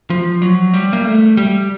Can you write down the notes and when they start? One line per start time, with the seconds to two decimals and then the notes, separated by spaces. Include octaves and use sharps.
0.10 F3
0.42 F#3
0.73 G3
0.93 A#3
1.05 A3
1.37 G3